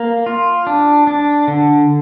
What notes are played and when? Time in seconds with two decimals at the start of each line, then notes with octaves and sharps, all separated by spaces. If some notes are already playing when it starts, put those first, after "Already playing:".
Already playing: A#3
0.26 F4
0.67 D4
1.07 D4
1.48 D3